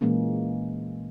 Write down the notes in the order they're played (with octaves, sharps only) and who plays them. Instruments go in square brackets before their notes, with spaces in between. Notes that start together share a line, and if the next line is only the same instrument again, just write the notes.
[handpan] A#2 E3 G#3 A#3 C#4